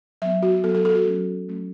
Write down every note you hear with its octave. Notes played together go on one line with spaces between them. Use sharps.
F#3 B3 E5
F#4
F#3 B3 A4
A4
A4
F#4
F#3 A3 C#4
F#3 A3 C#4